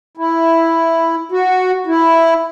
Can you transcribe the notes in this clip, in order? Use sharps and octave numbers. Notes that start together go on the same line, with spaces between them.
E4
F#4
E4